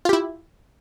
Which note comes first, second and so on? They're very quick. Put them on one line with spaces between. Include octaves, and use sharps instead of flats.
F4 G4 E4